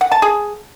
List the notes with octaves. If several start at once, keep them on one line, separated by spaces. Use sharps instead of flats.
F#5
A5
G#4